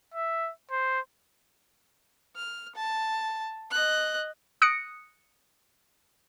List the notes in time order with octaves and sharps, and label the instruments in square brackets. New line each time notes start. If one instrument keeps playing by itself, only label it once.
[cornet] E5
C5
[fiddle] F6
A5
D#5 F#6
[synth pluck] D#6 F#6 A#6 C#7 D7